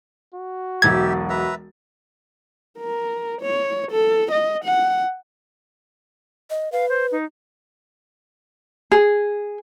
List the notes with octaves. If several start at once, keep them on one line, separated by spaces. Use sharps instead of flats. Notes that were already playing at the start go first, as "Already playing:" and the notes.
F#4
E1 B1 G4 E5 G#6 A6
B4 E5 A#5
A#4
C#5
A4
D#5
F#5
D#5
B4 F5
C5
D#4
G#4